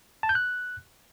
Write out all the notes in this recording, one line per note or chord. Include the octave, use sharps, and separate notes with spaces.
A5
G6
F#6